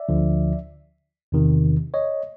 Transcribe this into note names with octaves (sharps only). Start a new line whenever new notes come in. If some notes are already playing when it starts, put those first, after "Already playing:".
Already playing: D5 E5
D2 D3 F3
E2 C3 D#3
C#5 D#5